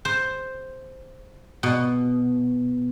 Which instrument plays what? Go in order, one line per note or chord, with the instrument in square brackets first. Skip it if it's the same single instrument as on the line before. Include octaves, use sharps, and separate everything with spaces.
[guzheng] C5
B2